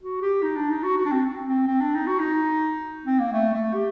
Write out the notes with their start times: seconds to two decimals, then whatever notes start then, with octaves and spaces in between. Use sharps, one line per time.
0.01 F#4
0.22 G4
0.43 D#4
0.56 D4
0.70 D#4
0.84 F#4
0.98 F#4
1.05 D4
1.12 C4
1.46 C4
1.67 C4
1.81 D4
1.95 D#4
2.07 F#4
2.19 D#4
3.05 C4
3.19 A#3
3.33 A3
3.54 A3
3.74 G4